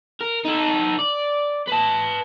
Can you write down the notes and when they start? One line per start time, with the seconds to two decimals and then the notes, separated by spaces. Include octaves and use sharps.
0.21 A#4
0.45 D#4 A4
0.99 D5
1.67 B4 A5